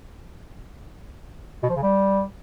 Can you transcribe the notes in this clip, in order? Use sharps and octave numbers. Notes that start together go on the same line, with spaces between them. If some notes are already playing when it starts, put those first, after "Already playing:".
B2
F3
C#3
G3